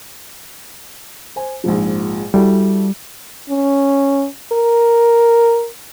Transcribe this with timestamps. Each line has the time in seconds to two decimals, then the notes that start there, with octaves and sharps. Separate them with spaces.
1.36 C5 G#5
1.64 A#1 G#2 F3
2.34 G3 E4 F#4 A4
3.49 C#4
4.52 A#4